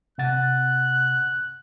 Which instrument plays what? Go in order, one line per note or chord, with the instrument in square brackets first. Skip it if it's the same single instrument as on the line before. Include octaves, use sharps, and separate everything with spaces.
[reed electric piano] C3 F#5 A6 [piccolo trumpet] F#6